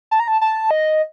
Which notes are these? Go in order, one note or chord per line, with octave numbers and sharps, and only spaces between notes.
A5
A#5
A5
A5
D#5